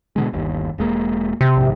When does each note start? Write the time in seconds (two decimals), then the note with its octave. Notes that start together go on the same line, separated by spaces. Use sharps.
0.16 B2 D3 G#3
0.33 G1 D#2
0.78 E1 G#3 A#3
1.41 C3
1.57 A#1 G#2